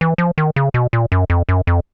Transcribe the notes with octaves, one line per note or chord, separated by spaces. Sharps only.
E3
F3
D#3
C#3
B2
A#2
F#2
F2
F#2
F2